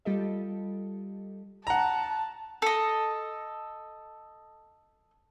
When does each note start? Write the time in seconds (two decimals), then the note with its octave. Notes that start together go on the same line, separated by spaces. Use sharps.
0.05 G3 F4 G4 A4 D#5
1.67 F#5 A5 A#5
2.62 A4 D#5